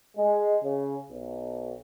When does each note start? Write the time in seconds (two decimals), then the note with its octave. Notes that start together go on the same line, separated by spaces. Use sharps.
0.17 G#3
0.63 C#3
1.10 B1